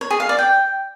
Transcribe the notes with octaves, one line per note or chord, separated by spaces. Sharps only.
C#5
G#4
F5
D5
G5